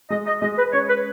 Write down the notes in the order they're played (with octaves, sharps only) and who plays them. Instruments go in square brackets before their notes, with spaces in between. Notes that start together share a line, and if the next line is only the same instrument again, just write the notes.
[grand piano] G#3 [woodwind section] D#5
[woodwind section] D#5
[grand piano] G#3 [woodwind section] D#5
[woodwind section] B4
[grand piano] C#4 [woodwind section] C#5
[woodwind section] B4